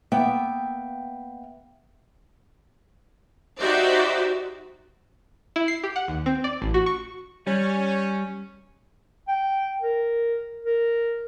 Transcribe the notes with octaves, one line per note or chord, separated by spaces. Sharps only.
A#3 B3 E5 G5
D#4 F#4 G4 C5 D5 E5
E4
C7
G4
F#5
D#2
C4
D5
A1
F#4
C#6
G3 C#4
G5
A#4
A#4